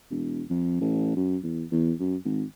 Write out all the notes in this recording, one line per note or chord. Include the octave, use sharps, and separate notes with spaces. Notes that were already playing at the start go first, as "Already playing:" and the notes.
E1
F2
A1
F#2
E2
E2
F#2
G#1